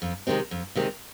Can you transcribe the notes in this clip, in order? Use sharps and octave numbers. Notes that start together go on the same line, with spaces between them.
F2
C3 D#3 G#3 C4
F2
C3 D#3 G#3 C4